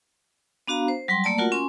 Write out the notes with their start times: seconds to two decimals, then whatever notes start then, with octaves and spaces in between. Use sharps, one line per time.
0.68 B3 D4 F#4 F5 A#5
0.88 C5
1.08 F#3 G3 G5 C6
1.24 A3 A#3 D5 A5
1.38 F4 F#4 A#4 F#5
1.52 C#4 G#5 C6